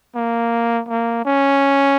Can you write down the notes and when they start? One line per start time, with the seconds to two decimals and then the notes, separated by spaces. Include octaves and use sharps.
0.15 A#3
0.89 A#3
1.25 C#4